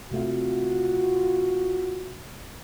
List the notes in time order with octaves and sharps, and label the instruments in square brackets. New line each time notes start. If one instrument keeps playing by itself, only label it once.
[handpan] C3 A3 F5 [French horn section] F4 F#4